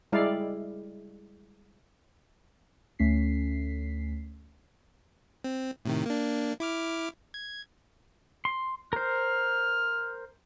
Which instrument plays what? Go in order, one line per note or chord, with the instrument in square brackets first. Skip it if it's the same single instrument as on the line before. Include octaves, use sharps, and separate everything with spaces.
[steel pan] G3 G#3 E4 D5 F5
[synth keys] D2 A3 C#4 B6 C7
[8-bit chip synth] C4
A2 C3 D#3
A#3 D4
E4 D6 F6
G#6
[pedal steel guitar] C6
[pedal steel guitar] A#4 C5 [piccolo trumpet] F6